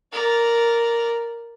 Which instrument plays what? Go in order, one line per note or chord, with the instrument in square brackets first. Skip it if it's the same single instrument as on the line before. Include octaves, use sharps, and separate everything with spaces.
[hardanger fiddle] A#4 D5